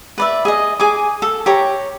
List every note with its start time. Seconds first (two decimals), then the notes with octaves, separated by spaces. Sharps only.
0.18 B4 D5 E5
0.45 G#4 D#5
0.80 G#4 G#5 D6
1.22 A4
1.46 G4 C#5 A#5